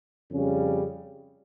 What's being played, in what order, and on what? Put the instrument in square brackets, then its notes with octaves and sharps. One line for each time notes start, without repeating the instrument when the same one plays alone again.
[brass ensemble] F2 C#3 G3 C#4